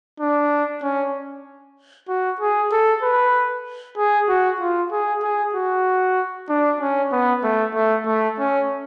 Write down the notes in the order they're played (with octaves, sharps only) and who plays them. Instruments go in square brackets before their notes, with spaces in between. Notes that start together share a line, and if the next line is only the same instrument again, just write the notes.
[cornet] D4
C#4
F#4
G#4
A4
B4
G#4
F#4
F4
G#4
G#4
F#4
D4
C#4
B3
A3
A3
A3
C#4